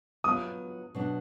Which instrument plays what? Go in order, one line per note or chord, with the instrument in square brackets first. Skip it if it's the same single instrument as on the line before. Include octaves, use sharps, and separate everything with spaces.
[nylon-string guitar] F#3 B3 F4 [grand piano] D#6
[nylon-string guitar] B2 F#3 D4